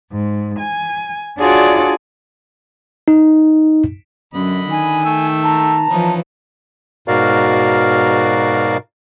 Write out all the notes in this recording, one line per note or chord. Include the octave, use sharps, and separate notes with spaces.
G#2
G#5
D4 F4 F#4 G#4 C#5 D5
D#4
F#2 D3 D#5 B5
D#3 G#5
A3 G5 E6
A5 A#5
E3 F3 C#4 D#4 B4
G#2 B2 F#4 A#4 D5 F5